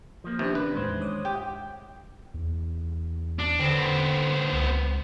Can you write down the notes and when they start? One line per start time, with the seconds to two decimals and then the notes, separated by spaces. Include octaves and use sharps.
0.24 F3 A#3
0.39 D#2 C3 B3 C#4 D4
0.55 B4
0.74 E2 A2 D#3 G#3 C5
1.02 C#5 D6 D#6
1.25 G4 G5
2.34 E2
3.39 D4
3.60 D3 B3 C4
4.53 C#2